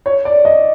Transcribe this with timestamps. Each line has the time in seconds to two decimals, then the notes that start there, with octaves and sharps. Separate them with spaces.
0.06 C#5
0.25 D5
0.45 D#5